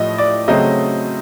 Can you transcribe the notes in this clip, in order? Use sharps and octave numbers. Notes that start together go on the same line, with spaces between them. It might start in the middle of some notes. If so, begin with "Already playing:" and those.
Already playing: A2 F3 A3 D#5
D5
C#3 F#3 A3 C4 D#5